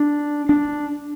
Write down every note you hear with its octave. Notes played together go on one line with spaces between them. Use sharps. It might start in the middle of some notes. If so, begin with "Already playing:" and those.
Already playing: D4
D4